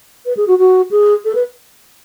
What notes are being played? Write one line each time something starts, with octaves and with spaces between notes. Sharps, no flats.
B4
G#4
F#4
F#4
G#4
A4
B4